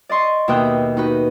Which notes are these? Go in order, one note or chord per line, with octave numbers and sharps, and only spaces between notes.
D5 D#5 C6 C#6
D#2 B2 E5 G5 D#6 F#6
D#4 F#4 B4